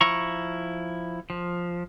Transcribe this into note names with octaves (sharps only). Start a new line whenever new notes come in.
F3 E4 A#5 C#6
F3